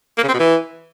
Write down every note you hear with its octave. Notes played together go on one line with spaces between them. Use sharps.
A#3
C#3
C4
B2
E3